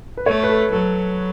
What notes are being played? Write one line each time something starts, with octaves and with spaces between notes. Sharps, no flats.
B4
A3 C#5
B4
A4
F#3 A4